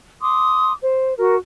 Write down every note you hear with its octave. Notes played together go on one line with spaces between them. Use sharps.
C6 D6 D#6
C5
F#4 A#4